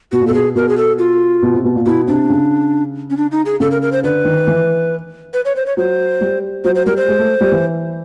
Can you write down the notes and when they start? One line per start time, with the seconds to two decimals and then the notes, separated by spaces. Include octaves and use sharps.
0.12 B2 F#4
0.21 A#2
0.27 A4
0.30 B2 G#4
0.55 B2 A#4
0.69 G#4
0.77 A4
0.99 F4
1.42 B2
1.54 C3
1.64 B2
1.75 A#2
1.86 B2 E4
2.08 C3 D4
2.30 C#3
3.10 C#4
3.17 D4
3.32 D#4
3.46 G#4
3.60 C#3 A4
3.71 A#4
3.82 A#4
3.92 C5
4.04 D3 B4
4.25 D#3
4.47 E3
5.34 B4
5.45 C#5
5.56 C5
5.66 C#5
5.77 F#3 C5
6.21 G3
6.64 F#3 C5
6.75 C5
6.86 G3 A#4
6.97 C5
7.08 G#3
7.19 A3
7.41 G3
7.52 E3